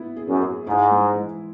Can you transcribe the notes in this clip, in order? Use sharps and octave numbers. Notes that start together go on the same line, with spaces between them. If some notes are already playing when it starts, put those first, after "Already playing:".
Already playing: B3 E4
G#4
F#2
G#4
G#2 E4
G#3
E3